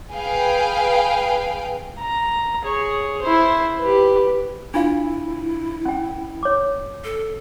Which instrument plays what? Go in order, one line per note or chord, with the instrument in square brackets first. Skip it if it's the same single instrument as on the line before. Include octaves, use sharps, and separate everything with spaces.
[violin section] G#4 B4 F5 G5
[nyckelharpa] A#5
G#4 C#5
E4 C5
G4 B4
[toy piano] D4 F4 F5 [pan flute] E4
[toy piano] C#4 G5
C#5 D6
[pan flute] A4